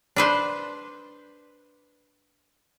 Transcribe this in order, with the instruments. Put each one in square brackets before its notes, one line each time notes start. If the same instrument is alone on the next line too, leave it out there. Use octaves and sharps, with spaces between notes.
[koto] D4 B4 C5